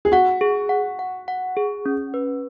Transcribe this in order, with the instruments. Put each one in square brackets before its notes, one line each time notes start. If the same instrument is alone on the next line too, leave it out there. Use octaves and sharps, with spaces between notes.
[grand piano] G#4
[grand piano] F#4 [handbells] F#5
[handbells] G#4
F#5
F#5
F#5
G#4
C#4
B4